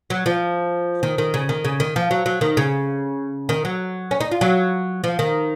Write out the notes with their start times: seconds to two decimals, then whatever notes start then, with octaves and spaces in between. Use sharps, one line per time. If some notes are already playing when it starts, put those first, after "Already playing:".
0.10 F#3
0.26 F3
1.03 D#3
1.18 D#3
1.34 C#3
1.49 D#3
1.65 C#3
1.80 D#3
1.96 F3
2.11 F#3
2.26 F#3
2.41 D#3
2.57 C#3
3.49 D#3
3.65 F#3
4.11 C#4
4.20 D#4
4.32 F4
4.41 F#3
5.04 F3
5.19 D#3